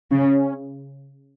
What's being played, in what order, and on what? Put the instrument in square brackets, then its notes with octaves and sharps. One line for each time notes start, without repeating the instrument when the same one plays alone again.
[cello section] C#3 [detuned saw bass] C#4